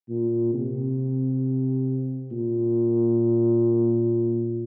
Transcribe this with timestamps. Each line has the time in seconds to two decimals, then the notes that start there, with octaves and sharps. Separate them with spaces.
0.09 A#2
0.53 C3
2.32 A#2